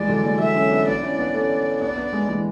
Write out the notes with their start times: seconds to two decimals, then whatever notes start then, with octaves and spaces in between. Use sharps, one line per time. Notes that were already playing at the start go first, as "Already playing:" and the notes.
Already playing: E3 G#3 D5
0.09 D3 F#3
0.24 E3 G#3
0.40 F#3 A3 E5
0.56 A3 C#4
0.71 B3 D4
0.87 B3 D4 D5
1.03 C#4 E4
1.18 B3 D4
1.34 A3 C#4
1.81 B3 D4 D5
1.96 B3 D4
2.13 G#3 B3
2.28 E3 G#3